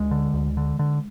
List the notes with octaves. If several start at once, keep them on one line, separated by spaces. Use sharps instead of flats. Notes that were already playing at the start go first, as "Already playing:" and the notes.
Already playing: D2 G#3
D3
D2
D3
D3